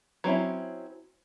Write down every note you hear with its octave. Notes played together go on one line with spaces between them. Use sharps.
F#3 C4 C#4 E4